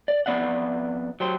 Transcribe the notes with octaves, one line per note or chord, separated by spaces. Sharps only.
D5
F2 F#3 B3 D5 E5 F#5
F#3 G4 C5